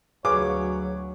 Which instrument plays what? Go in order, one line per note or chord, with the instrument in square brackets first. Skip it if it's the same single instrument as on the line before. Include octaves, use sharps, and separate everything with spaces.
[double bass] D2 F#3 [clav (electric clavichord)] G#4 B4 F5 [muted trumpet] C#5 [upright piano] D6